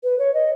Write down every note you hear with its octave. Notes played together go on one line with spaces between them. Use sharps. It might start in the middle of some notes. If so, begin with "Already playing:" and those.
B4
C#5
D#5